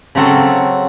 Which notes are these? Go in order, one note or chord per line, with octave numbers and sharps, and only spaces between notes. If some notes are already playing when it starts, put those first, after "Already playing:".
C#3 F#3 C4 F#4 A4